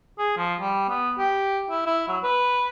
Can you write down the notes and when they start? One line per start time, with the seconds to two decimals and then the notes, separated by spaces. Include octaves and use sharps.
0.18 G#4
0.37 F3
0.60 G3
0.89 B3
1.18 G4
1.70 E4
1.86 E4
2.08 F#3
2.23 B4